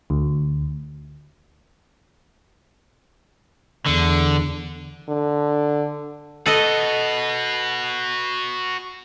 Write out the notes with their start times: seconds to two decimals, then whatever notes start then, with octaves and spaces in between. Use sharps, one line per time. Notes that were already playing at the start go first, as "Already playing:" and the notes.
0.10 D2
3.86 E2 D3
5.09 D3
6.46 F#4 A4 B4 D#5